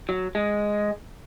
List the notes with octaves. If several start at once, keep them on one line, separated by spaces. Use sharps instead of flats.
F#3
G#3